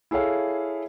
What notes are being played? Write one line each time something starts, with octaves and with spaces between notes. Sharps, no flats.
E4 G#4 A4 C#5 F5